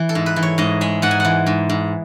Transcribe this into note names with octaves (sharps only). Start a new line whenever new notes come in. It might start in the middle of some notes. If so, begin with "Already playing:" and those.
Already playing: E3
A4
G#2
B4
E3
C#5
G#2 D#5
G#3 E5
G#2 F#5
G#5
E3 F#5
G#2
G#2